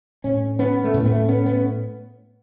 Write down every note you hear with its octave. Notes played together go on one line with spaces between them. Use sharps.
A2 C#4
B3 C#4
A3
A2 B3
B3
A3
B3 C#4
B3